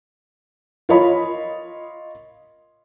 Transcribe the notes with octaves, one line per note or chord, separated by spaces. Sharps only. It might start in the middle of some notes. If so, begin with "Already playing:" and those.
F4 A#4 C#5 D#5 B5